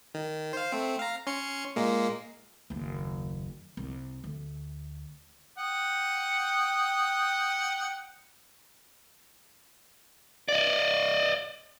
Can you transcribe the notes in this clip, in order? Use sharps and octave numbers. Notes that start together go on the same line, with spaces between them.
D#3
C5 F5
A3 C4
F5 A#5
C#4 C6 C#7
A#2 G#3 A#3
F#1 D#2
C2
D2
F#5 G5 D#6
D5 D#5